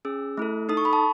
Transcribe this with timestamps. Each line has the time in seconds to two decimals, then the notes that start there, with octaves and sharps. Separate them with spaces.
0.05 C#4 G#4 E6
0.37 A3 E4 A4
0.69 D#4 A4 D#6
0.77 C#6
0.85 B5
0.93 A5